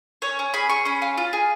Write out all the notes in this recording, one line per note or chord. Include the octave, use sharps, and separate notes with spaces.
C#4 C#5
C#4
G#4 B5
G#4 C#6
C#4 B5
F4
F4
G#4